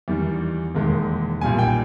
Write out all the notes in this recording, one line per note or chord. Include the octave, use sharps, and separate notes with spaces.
E2 D#3 G3
E1 D#2 D#3 G#3
B1 A#2 G3 G#5
G5